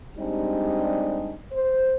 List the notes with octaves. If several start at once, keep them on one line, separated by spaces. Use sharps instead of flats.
G3 G#3 C4 D4 D#4 G4
C5